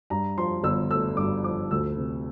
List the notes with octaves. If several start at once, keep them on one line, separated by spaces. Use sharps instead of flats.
G2 A#5
F3 C6
G1 E6
A3 E6
G2 D6
F3 D6
D2 E6
C3